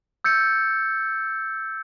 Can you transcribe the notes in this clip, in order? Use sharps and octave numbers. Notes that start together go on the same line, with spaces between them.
E6 G6 A6 C#7